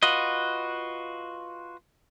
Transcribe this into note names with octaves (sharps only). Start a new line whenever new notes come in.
F4 F#4 B4 D#5